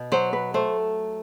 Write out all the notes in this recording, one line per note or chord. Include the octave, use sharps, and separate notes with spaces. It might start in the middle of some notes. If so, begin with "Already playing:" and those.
Already playing: B2
F#3 C5
B4
A3 C5